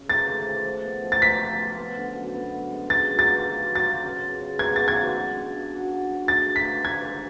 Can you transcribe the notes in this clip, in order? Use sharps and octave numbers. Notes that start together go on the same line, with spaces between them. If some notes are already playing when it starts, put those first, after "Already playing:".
Already playing: C#3
A3 A6
A3
F3
F3
B3
F3
A6
F4 B6
F3
F4
B3
D3
F#2
B3
F#2
G#3
F4 A6
F#3
A6
F4
F4
F#3
A6
F4
C#3
C#3
C#3
B3 G#6
B3 A6
G#6
F#3
G#3
D4
D4
F#4
F#4
G#3
A3 A6
G#4
B6
G#4
D4 G#6
G#4